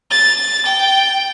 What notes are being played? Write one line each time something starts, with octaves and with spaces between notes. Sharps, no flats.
A6
G5